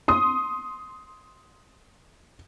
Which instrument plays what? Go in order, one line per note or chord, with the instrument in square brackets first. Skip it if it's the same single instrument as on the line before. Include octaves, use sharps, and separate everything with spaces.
[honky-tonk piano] C6 D#6